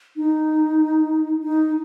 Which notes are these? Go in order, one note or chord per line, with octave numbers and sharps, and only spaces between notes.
D#4
D#4